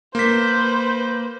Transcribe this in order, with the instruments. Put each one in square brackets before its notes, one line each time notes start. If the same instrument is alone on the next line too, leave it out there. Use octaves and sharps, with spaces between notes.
[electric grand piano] A#3 B6 [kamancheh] B4 C5